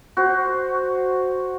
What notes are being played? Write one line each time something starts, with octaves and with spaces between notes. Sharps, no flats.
F#4 C5